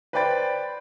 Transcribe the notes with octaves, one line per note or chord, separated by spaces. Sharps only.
B4 C5 D5 G5 B5 A6